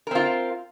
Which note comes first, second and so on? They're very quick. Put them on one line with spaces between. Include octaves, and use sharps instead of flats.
A#4 C4 F4